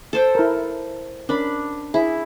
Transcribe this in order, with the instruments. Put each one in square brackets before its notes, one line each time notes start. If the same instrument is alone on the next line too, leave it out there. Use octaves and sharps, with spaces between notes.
[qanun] A4 C5 G5
[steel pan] E4 A#4
[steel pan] C#4 A#4 [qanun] D4 B5
[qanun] E4 [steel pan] G#4